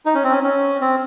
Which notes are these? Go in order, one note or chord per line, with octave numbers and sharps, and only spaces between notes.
D#4
C#4
C4
C#4
C#4
C4